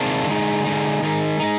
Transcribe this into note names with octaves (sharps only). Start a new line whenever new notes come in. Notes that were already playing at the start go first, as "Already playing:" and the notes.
Already playing: C3 D#3 G#3 D4 F4
D3 G#3 D#4
D3 G#3 D#4
D#3 G#3 D#4
G#3 D#4